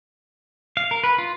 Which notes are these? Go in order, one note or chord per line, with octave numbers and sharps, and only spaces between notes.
F5
A#4
B4
F4